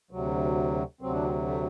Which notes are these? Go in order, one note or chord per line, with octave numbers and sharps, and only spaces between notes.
D2 C3 F#3
D2 C3 F#3 C4
D4
C4
A3